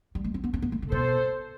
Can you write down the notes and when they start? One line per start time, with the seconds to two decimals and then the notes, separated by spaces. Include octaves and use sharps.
0.15 G3
0.24 A3
0.34 C4
0.44 B3
0.53 C4
0.62 B3
0.72 A3
0.82 C3
0.91 B2 A4 C5